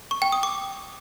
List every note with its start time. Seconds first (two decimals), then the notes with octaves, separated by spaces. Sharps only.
0.11 C#6
0.22 G5
0.32 D#6
0.43 D6